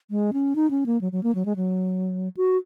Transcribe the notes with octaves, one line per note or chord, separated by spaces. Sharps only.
G#3
C#4
D#4
C#4
A#3
F#3
F#3
A#3
F#3
G#3
F#3
F#4